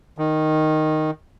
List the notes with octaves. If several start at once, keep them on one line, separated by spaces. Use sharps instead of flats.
D#3